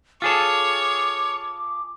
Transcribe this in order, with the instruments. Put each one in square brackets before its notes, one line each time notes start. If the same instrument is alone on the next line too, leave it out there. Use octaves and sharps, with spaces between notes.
[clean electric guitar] F4 G#4 A4 [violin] C#5 [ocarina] D6